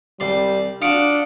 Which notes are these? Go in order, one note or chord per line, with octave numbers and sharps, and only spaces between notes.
C2 G3 D5 C6
D4 F4 F#4 D#6 C#7 D7